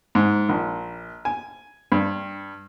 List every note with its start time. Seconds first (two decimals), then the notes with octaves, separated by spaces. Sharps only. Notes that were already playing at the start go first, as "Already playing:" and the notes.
0.15 G#2
0.49 A#1
1.25 G#5
1.92 G2